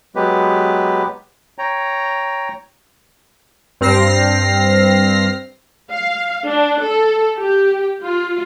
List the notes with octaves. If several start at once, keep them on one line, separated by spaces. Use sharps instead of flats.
F#3 G#3 B3 G4 B4
C#5 G5 A#5
G2 C4 F6 A#6 C7
F5
D4
A4
G4
F4